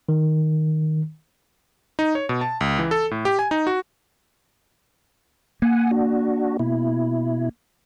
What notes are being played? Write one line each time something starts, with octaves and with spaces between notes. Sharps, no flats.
D#3
D#4
C#5
B2
A5
C#2
E3
A4
A2
G4
G#5
D#4
F#4
A#3 F#5 G#5
D4 F#4
B2 E4